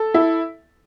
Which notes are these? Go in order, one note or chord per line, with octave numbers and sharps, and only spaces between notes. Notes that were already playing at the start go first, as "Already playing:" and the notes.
Already playing: A4
E4